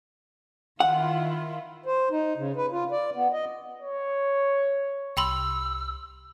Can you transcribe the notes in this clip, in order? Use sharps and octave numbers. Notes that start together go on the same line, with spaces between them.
D#3 E4 F4 F#5
C5
D#4
C#3
B4
F4
D5
B3
D#5
C#5
C2 G5 B5 C6 E6